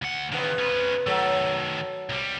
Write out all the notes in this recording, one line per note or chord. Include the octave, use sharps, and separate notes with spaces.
D2 F#5
C3 D#3 E3 B3
C#4 B4
D#3 F#3 A3 A4
C2 G3